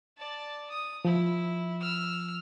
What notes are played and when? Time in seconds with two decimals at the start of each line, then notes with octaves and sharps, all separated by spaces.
0.18 D5 A5
0.71 D#6
1.05 F3 E4
1.81 E6 F6